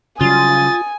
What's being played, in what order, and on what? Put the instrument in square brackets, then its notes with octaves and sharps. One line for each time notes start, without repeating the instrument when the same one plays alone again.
[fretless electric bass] C#3 F#3 G3 [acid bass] F4 [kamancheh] G#5 [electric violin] D#6 A6